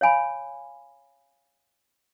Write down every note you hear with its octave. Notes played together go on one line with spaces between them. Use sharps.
C#5 F5 G#5 B5